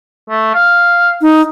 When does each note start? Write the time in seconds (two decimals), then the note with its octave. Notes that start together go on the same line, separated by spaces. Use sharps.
0.30 A3
0.55 F5
1.21 D#4